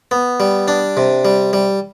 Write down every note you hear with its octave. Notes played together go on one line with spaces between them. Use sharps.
B3
G3
D4
C3
G3
G3